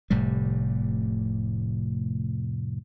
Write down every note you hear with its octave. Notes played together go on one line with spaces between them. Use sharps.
F1 A2 C3 G3